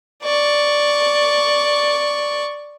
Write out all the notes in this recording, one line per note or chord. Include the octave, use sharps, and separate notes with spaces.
D5 C#6